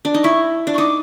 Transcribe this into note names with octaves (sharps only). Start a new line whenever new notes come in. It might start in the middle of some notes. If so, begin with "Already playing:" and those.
D4
D#4
E4 C#6
D4
C#6
D#4 D6